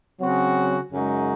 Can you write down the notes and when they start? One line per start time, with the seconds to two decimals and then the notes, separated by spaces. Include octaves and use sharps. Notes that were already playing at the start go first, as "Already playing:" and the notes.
0.21 C#3 F#3 C4 F#4
0.92 F#2 C#3 G#3 D#4 F#4